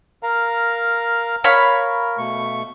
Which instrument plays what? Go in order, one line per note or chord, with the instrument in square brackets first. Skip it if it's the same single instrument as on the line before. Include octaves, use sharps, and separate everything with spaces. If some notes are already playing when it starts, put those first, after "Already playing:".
[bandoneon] A#4 F5 A#5
[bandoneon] A#4 [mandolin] C#5 F5 B5
[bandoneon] B2 A3 C#6